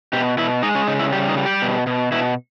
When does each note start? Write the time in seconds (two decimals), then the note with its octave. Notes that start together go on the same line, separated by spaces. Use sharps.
0.13 B2 G4
0.38 B2 E4
0.63 G#3 D#4
0.75 C#4
0.87 C#3 D#4
0.99 E4
1.12 G3 G4
1.29 D#4
1.37 G3
1.46 G4
1.62 B2
1.87 B2
2.12 B2 E4